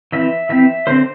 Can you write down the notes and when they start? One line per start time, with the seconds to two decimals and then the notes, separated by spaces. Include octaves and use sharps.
0.12 E3 C4 E5
0.49 E3 C4 E5
0.87 D3 C4 C5